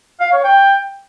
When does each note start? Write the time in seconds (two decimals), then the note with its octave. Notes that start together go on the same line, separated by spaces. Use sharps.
0.20 F5
0.32 C#5
0.44 G5